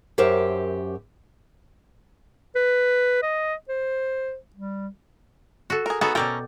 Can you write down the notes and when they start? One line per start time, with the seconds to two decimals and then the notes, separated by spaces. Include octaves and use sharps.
0.18 F#2 G4 A#4 C5 E5
2.56 B4
3.22 D#5
3.69 C5
4.55 G3
5.70 F#4 A4
5.86 G#4 A#4
6.01 B3 D#4 F#4 G#4 A4
6.15 B2 C#4 A4 A#4 D5 G5